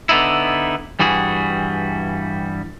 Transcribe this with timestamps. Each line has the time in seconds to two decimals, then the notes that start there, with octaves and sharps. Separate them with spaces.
0.09 D3 B3 D#4 E4
1.00 G2 E3 G3 F#4 G#4